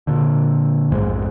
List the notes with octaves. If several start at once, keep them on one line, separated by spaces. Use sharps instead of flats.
A#2 D3
A#1 F2 G#2 G#3